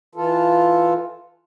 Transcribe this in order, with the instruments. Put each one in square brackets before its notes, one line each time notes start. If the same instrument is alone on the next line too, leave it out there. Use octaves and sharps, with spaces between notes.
[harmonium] E3 F4 A4